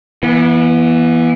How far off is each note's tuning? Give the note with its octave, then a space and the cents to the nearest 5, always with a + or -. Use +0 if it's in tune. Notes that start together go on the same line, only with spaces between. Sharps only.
E3 +5 B3 -35